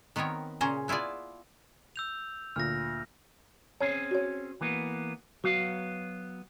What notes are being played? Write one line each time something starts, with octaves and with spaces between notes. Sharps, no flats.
D#3 B3 C4 A#4 C#5
A#2 C#3 C#4 G#4 C5 A#5
B3 E4 F4 G#4 D5
E6 G6 F7
D2 A#2 F6 A#6
C4 C#4 G#4 C#5
F#4 C#5
E3 A#3 B3
F#3 B3 F#4 F5